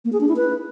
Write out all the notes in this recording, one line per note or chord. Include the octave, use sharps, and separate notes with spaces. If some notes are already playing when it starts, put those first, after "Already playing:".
A#3
G#4
D4
E4
B4